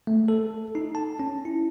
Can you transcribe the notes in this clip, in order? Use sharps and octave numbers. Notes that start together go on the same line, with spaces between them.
A3
A4
D#4
A5
C#4
E4